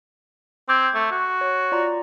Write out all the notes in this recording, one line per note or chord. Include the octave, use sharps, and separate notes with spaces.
C4 D6 G6 G#6
A3
F#4
C#5
F4 D5 A#5